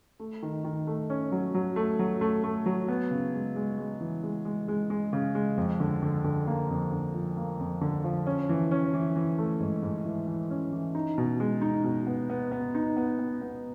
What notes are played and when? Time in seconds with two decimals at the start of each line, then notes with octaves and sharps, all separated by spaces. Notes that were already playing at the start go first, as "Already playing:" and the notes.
0.20 A3
0.43 D#3
0.64 D#3
0.87 A3
1.10 C#4
1.32 F#3
1.54 F#3
1.76 A3
1.99 F#3
2.21 A3
2.44 A3
2.66 F#3
2.88 B3
3.11 C#3
3.34 G#3
3.56 G#3
3.78 G#3
4.01 E3
4.23 G#3
4.45 G#3
4.68 G#3
4.90 G#3
5.13 C#3
5.35 G#3
5.57 F2
5.80 D3
6.03 D3
6.24 D3
6.47 A#3
6.70 F2
6.92 D3
7.14 F3
7.37 A#3
7.59 F2
7.81 D3
8.04 F3
8.27 C#4
8.49 E3
8.71 C#4
8.94 E3
9.16 E3
9.38 A3
9.60 G#2
9.83 G#2
10.05 E3
10.27 E3
10.50 C#4
10.72 E3
10.95 D#4
11.18 B2
11.40 G#3
11.62 D#4
11.84 B2
12.07 B3
12.30 B3
12.52 B3
12.75 D#4
12.97 B3
13.19 B3
13.41 B3